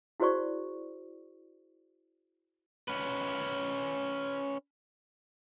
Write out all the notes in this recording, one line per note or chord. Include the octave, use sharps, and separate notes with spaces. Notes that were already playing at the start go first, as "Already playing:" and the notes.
E4 F#4 G#4 C5 D5 C#6
C#4 B4